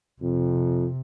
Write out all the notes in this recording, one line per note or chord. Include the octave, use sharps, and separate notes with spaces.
F2 C3